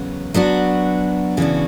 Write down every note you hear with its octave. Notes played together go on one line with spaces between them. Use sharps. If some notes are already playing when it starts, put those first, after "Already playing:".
Already playing: E2 C#3 F#3 B3
F#3 B3 D4 F#4
C#3 E3 B3 D4 F#4